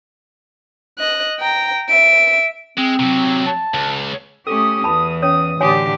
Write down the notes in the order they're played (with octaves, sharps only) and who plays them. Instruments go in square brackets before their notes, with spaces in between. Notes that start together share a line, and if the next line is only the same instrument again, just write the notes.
[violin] D#5 F#6
G5 A#5
E5 D7
[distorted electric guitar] G#3 [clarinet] C4
[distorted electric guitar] C3 F#3
[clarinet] A5
[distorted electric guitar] C#2
[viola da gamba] A3 C#4 G4 [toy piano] A4 [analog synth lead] D#6
[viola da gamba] E2 E3 [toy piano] A5 B5
[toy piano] C#4 C#5 [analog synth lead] D#6
[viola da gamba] A2 D3 G4 [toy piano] F#4 C#5 G#5